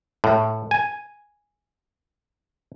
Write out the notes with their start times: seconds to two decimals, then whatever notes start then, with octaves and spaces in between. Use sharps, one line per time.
0.24 A2
0.71 G#5